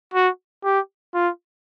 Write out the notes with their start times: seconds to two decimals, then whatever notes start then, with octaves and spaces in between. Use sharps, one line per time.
0.14 F#4
0.65 G4
1.14 F4